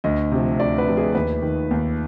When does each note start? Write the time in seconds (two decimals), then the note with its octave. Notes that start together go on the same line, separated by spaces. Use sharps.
0.04 D2 D#5
0.32 C3 F3
0.60 D2 D5
0.78 B4
0.88 C3 F3
0.97 G#4
1.15 D#2 B4
1.42 D#3
1.71 D#2